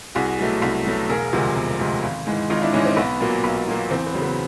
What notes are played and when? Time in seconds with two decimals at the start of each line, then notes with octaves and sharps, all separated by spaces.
0.15 C2 F#4 G#4
0.39 B2 F#3 A3
0.62 C2
0.86 B2 F#3 A3
1.09 E1 G#4 A#4
1.33 D2 C3 F3 G#3
1.56 E1
1.80 D2 C3 F3 G#3
2.03 G#1
2.26 G#2 E3 G#3
2.50 G#1 D#4 F4
2.62 D4 E4
2.73 G#2 E3 G#3 C#4 D#4
2.85 C4
2.97 B1 B3
3.20 A#2 F#3 A#3
3.44 B1
3.67 A#2 F#3 A#3
3.91 E2 C4
4.06 B3
4.14 C#3 F#3
4.22 B3